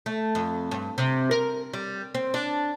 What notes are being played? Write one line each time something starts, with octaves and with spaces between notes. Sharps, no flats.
A3
F2
G2
C3
A#4
G3
C4
D4